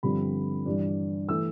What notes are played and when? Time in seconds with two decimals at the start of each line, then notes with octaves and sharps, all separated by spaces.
0.03 G2 D3 F3 C4 B5
0.66 G2 E3 G3 D4
1.29 E3 A3 E4 E6